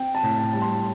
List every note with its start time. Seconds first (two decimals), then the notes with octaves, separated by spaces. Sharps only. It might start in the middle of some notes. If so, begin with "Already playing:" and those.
Already playing: C4 G5
0.15 A5
0.23 A2
0.38 A5
0.53 G3 A5
0.62 C6